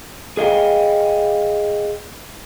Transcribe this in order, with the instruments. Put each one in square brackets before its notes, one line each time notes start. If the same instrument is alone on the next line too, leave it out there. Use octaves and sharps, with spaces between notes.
[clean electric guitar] G#4 D#5 F5 G5